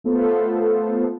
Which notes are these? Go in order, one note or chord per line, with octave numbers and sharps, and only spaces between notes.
A3 B3 F4 A4 C5